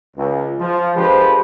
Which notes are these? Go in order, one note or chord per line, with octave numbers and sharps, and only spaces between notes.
C#2
F3
D3 F3 G#3 G4 B4 C5